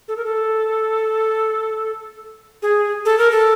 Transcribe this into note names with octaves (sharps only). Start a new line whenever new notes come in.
A4
A#4
A4
G#4
A4
A#4
A4